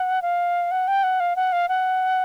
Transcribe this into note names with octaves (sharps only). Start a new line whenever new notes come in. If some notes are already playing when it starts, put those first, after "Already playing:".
Already playing: F#5
F5
F#5
G5
F#5
F5
F#5
F5
F#5